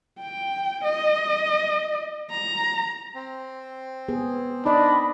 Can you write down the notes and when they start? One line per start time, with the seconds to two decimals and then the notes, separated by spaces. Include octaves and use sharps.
0.19 G5
0.84 D#5
2.31 A#5
3.15 C4
4.08 B3 G#4
4.65 D4 D#4 D5 D#5 B5